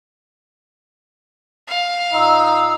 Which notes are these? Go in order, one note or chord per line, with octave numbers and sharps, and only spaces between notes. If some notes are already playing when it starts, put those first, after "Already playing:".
F5
A#2 D#4 C6 E6